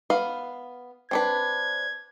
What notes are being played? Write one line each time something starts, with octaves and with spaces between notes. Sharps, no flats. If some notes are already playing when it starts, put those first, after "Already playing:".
B3 B4 F5
C4 D4 B4 G#6